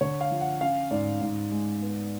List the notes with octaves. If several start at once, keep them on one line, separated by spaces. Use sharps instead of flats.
D3 C#5
F5
F3
F#5
C#4 F5
G#2 D5
G#2
G#3
B3